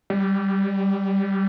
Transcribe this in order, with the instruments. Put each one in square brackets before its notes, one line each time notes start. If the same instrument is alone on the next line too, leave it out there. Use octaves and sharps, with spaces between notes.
[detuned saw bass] G3